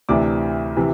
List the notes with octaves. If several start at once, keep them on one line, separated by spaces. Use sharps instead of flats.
D2 C3 E3 D5 D6
C3 E3